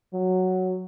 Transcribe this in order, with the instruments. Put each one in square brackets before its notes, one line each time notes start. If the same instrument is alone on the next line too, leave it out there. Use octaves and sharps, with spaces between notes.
[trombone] F#3